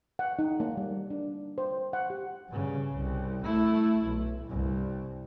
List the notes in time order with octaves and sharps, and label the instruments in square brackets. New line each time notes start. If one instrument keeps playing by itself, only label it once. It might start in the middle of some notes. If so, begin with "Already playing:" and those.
[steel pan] F#5
D#4
A#3
G3
D4
C5
F#5
G4
[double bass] G2 C#3
C2
A3 E4
B1
C2 G2